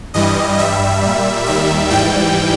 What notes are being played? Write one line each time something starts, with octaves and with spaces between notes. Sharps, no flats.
G2 E3 G3 D#5
G2 G3 E5
A#2 G3
D#2 D#3 G3 E5
G#2 E3 G3 G5